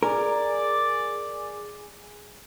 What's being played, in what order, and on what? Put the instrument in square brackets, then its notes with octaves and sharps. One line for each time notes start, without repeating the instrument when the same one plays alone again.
[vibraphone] G#4 G#5 [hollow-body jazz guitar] A#4 [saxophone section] D5